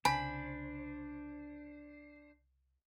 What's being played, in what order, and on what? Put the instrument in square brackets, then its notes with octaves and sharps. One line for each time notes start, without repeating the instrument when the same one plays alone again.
[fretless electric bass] C2 C#3 [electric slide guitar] D4 C5 [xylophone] G#5 [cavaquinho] B5